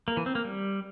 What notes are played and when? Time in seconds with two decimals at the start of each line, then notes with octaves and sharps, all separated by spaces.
0.08 A#3
0.17 E3
0.26 C4
0.35 A#3
0.44 G3